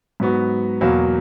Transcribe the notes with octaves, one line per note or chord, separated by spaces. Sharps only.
G#2 F#3 B3 F#4
E2 B2 F#3 A#3